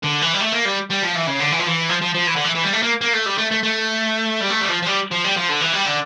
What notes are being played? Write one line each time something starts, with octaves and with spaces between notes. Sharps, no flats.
D3
E3
G3
A3
A#3
G3
G3
F3
E3
C#3
D3
E3
F3
E3
F3
F3
F3
E3
D3
E3
E3
G3
A3
A#3
A#3
A3
G3
A3
A3
A3
G3
A3
G3
F3
F3
G3
F3
G3
F3
D3
E3
G3
D3